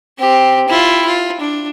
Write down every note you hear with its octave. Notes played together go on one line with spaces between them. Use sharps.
C4 G4
E4 F4
F4
D4